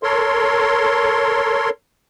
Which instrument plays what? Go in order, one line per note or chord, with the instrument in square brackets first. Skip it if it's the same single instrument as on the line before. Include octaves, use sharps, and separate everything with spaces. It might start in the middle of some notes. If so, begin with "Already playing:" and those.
[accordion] A4 A#4 C#5 C6